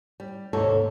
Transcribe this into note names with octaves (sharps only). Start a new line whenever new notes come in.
G3
D#2 G#2 C3 A4 C#5